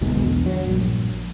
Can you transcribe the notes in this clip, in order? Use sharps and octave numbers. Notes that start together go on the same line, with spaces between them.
D2 G#2 B2 G#3
B1 E2 D3
F#3
A#1 G2